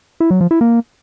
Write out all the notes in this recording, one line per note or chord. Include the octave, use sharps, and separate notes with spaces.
E4
F#3
F3
E4
A#3